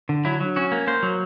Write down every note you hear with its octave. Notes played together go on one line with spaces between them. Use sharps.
D3
F#3 E4
F#3
C#4 F#4
A#3
A#3 C5
F#3